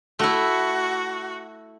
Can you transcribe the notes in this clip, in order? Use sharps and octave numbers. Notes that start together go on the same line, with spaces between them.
A3 E4 F#4